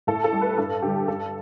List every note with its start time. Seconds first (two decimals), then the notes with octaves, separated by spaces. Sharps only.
0.07 A2 A4
0.24 A4
0.32 G3
0.41 B4
0.57 G2 A4
0.82 D3 G3 G4
1.08 G2 A4